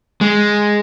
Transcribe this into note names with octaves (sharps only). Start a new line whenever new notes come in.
G#3